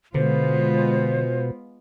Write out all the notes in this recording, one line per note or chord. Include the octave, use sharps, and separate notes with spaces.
B2 D3 G#3 B3 F4 C5